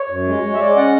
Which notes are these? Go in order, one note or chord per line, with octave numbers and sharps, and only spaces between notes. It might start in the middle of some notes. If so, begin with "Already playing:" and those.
Already playing: C#5
F#2
G#3
G#3
E5
G#3 D5
C#4 F#5